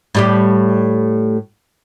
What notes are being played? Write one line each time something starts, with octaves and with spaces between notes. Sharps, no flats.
A2 G3 G4